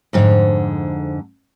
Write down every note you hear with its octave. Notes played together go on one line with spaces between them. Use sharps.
F2 G#2 D3